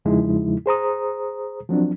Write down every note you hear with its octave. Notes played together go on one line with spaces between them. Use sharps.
E2 C#3 F3 G#3 D#4 E4
G#4 C5 A#5 D#6
F3 F#3 C4 D4